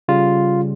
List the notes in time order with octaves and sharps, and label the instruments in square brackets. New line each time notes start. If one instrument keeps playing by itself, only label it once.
[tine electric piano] C#3 G3 F4